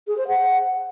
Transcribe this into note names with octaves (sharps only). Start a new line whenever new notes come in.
G#4
C5
F#5